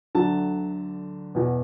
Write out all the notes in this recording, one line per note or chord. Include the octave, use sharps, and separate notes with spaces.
D2 D3 F#3 A5
E2 B2